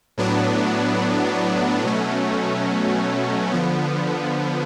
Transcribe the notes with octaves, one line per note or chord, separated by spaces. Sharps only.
A2 F#3 B3 D4
B2 F#3 A3 C#4
D3 F3 B3